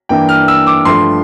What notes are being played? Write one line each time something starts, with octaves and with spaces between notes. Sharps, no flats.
G2 E3 A#3 D4 G5
F6
E6
D6
G2 F3 A3 C6